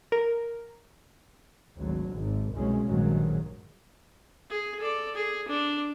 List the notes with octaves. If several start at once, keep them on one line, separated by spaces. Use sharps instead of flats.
A#4
G#1 D2 F#3
G#1 G#2
C2 F#2 B2 G#3 C#4
A#1 G2 D#3 F#3 G#3
G#4
A4 D5
G#4
D4